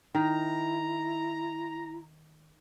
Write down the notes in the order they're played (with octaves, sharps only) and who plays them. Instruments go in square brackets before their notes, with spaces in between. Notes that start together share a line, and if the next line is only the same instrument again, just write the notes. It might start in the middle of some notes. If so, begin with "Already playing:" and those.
[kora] D#3 [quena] E4 [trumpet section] A#5